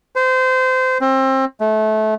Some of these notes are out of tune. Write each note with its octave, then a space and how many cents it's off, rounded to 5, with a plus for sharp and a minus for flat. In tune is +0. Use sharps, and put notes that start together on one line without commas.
C5 -25
C4 +25
A3 -25